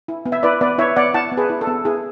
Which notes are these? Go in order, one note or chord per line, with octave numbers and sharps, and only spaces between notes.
E4
B3
E5
E4 B4 D5
B3 B4 D5
E4 C#5 E5
B3 D5 F#5
E4 F#5 A5
B3
G#4 B4
E4
A4
B3
E4 G#4